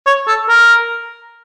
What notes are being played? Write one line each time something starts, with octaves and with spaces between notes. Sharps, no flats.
C#5
A4
A#4